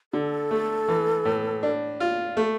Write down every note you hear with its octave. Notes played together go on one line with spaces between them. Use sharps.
D3 A4
A3
E3
A2
D4
F4
A3